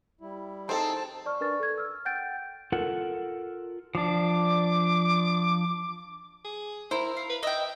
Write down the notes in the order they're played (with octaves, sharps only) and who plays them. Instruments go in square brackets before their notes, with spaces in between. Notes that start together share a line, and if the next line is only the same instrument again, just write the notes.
[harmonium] G3 E4
[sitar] C4 [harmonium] D#4 G#4 [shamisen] A4 C5 [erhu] A5
[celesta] D5 C#6 F6
D4 A#4 B4 D5 C#6 A6
A4 G#6
E6 F6
F#5 G5 G6 A6 D7
[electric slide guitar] F4 A4 A#4 F#5
[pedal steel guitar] F3 D4 [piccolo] D6
[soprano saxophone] G#4
[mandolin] E4 [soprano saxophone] A#4 [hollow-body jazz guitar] C5
[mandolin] F5
[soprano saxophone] B4
[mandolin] D#5 G5 [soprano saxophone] E5